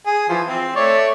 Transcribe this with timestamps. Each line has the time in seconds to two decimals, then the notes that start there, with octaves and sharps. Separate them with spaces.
0.06 G#4
0.29 E3 F3
0.47 C4
0.76 A3 C#5 D5